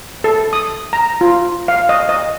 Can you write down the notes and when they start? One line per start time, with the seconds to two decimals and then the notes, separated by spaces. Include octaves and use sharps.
0.24 A4
0.53 D#6
0.93 A#5
1.21 F4
1.68 F5
1.89 D#5
2.09 D#5